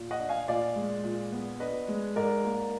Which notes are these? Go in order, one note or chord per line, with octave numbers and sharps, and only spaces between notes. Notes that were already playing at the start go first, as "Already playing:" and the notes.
Already playing: A#2
D#5 F#5
D4
F5 G#5
A#2 D5 F5
G#3
A#2
B3
D4 B4 D#5
G#3
G#2 A#4 D5
A#3